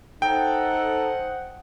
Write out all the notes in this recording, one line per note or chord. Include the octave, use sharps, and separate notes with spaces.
D#4 A4 C5 D#5 F#5 G5